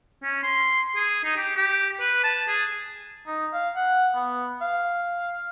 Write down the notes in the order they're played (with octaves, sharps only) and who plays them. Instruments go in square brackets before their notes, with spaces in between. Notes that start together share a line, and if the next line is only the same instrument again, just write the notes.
[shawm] C#4
C6
G#4
D#4
G4
G4
B4
A5
G#4
[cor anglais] D#4
F5
F#5
B3
F5